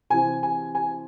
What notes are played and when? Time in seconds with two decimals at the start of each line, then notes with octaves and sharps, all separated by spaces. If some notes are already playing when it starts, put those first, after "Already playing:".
0.10 C3 E3 C4 G#5
0.43 G#5
0.75 G#5